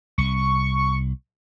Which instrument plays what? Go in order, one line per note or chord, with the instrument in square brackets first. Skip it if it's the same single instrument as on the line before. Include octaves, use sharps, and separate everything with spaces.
[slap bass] C2 [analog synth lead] C#6